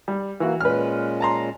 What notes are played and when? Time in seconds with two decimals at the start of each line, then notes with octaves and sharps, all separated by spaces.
0.08 G3
0.40 E3 A#3 F#4
0.60 A#2 G#3 C#4 B4 F6
1.20 A5 A#5 C6